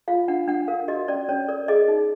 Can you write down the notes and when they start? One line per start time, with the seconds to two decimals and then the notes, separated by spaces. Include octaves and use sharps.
0.08 F4 F5
0.28 D4 F#5
0.48 D4 F#5
0.68 A#4 F5
0.88 F#4 D#5
1.08 C#4 D5
1.28 C#4 C#5
1.48 A#4 D5
1.68 G#4 D#5
1.88 D#4